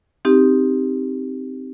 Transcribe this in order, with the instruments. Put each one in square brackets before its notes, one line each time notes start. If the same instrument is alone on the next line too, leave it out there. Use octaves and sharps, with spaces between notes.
[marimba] C4 D#4 G4